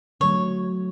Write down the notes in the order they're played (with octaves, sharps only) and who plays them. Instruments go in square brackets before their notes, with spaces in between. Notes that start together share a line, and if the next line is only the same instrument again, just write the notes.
[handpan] D3 F#3 A3 [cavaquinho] C#5